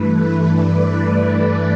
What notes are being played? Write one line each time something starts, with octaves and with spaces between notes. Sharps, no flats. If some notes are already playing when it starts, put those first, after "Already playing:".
Already playing: G2 E3 A3 B4
D5